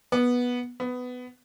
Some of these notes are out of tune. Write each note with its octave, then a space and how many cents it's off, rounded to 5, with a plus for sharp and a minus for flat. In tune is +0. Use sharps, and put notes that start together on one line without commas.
B3 -10
B3 +15